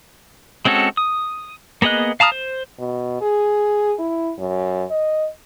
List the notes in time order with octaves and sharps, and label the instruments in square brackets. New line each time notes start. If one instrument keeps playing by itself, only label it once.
[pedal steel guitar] G#3 C4 C#4 F#4 A4
D#6
A#3 B3 G#4 D#5 F#6
F5 A5 A#5 D#6 F6
C5
[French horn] B2
G#4
E4
F#2
D#5